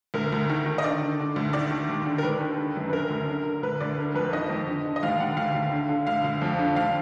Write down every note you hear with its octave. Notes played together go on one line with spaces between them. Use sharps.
D2 A#4
D2
D#3
D#3
D#5
D3 D5
D3
D3
D2
D#3 D5
D#3
D#2
D3
A#4
D#2 B4
D#3
D3
F#2
B4
D3 A#4
D2
D3
D3
D2 B4
D2 D5
D3 A#4
F2 B4
D#3 D#5
F2
D3
D3
D#5
D#2 F5
D#2 F#5
D2 F5
D2
D3
D3
D2 F5
D2
F2
D3
D#2 F5